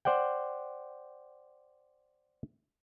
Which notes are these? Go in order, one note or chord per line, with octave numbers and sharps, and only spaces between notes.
C5 D5 F#5 G5